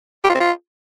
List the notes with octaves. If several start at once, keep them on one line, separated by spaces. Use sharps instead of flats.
G4
F4
C4
F4